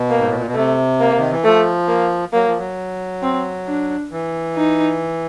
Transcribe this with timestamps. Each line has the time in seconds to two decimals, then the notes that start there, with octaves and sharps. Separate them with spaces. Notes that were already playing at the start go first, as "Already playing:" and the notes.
Already playing: B2
0.10 A#3
0.18 G#2
0.27 A2
0.37 A#2
0.46 B2
0.55 C3 A3
1.00 A#3
1.19 D#3
1.31 E3
1.44 F3 A3
1.89 A#3
2.33 F#3 A#3
2.46 F3
2.58 F#3
3.23 C4
3.68 D4
4.11 E3
4.56 D#4